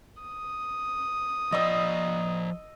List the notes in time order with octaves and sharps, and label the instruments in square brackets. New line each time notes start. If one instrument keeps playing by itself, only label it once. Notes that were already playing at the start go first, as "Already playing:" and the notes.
[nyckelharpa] D#6
[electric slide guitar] F3 D5 [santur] D#5 E6